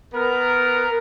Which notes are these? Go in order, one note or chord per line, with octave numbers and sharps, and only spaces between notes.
B3 A#4